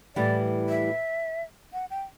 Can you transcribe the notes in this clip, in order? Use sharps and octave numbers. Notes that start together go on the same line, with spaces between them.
A2 E3 G3 D5
E5
F#5
G5